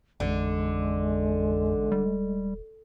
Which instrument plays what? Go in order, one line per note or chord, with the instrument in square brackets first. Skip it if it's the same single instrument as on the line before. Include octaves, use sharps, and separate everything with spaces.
[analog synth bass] A1 [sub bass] F2 [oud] D3 [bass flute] G#3
[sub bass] D#1 [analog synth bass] G3